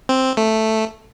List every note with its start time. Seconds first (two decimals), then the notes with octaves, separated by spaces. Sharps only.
0.09 C4
0.37 A3